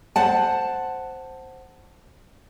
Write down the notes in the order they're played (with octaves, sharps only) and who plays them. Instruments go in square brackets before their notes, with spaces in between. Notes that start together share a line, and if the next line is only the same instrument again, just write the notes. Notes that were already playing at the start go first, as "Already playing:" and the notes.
[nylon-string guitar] C5 F#5 A5